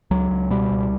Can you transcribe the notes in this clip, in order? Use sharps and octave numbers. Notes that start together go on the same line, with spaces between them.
C#2 F#3
C#2
B2 G3
C#2